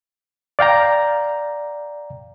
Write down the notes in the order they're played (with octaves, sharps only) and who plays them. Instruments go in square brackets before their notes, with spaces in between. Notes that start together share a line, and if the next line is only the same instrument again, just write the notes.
[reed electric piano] D5 F5 G5 A#5